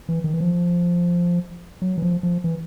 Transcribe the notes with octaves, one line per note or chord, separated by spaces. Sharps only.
E3
D#3
E3
F3
F#3
E3
F3
F3
E3